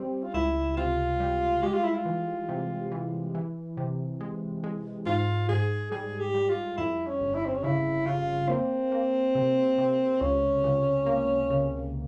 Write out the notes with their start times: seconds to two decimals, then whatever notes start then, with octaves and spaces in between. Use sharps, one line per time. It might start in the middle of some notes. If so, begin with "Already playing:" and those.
Already playing: G3 C4
0.24 F4
0.34 C#2 E4
0.77 C3 F4
1.20 G3
1.63 G#3 G4
1.73 F4
1.84 E4
1.95 F4
2.05 E3
2.49 C3
2.92 E3
3.35 E3
3.77 C3
4.21 G#3
4.64 G#3
5.06 G#2 F4
5.49 G#2 G#4
5.92 G3 G#4
6.20 G4
6.34 G3
6.49 F4
6.78 F2 E4
7.07 C#4
7.21 G1
7.35 E4
7.46 C4
7.55 C#4
7.64 C#3 E4
8.06 C#3 F4
8.49 A#3 C4
8.92 A#3
9.35 C3
9.78 C3
10.21 C#2 C#4
10.64 C#2
11.06 A#3
11.50 C#3